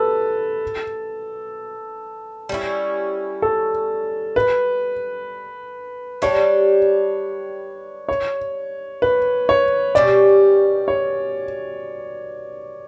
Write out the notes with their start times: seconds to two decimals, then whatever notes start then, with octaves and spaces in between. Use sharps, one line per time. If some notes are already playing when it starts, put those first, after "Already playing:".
Already playing: B2 G3 A4 B4
2.49 G3 C#4 E4
3.42 A4
4.36 B4
6.22 G3 D4 G4 C#5
8.09 C#5
9.02 B4
9.49 C#5
9.95 B2 G3 C#4 G4 D5
10.88 C#5